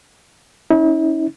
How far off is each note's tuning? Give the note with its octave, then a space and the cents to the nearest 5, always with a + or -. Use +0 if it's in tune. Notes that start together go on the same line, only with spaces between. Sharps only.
C#4 +0 E4 -45